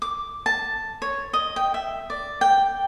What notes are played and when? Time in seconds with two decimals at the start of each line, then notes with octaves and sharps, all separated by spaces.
0.02 D6
0.46 A5
1.02 C#5
1.33 D#5
1.56 G5
1.74 E5
2.10 D5
2.41 G5